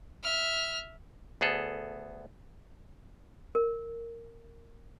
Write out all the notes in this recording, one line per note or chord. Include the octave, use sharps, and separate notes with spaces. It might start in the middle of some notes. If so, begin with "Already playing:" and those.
E5 F6
D2 B3 G#4 A4
A#4